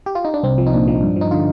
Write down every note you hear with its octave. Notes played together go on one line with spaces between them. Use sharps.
G4
F4
D#4
D4
C2 C4
F3
D#4
A#2 D4
F3
G2
F3
D#4
D3 F4